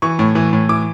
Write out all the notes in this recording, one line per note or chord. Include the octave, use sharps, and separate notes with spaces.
E3 C#6
A2
E3
A2
E3 D6